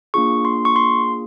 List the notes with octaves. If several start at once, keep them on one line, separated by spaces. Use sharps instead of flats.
A#3 D4 F4 G#4 C#6
C6
C#6
C6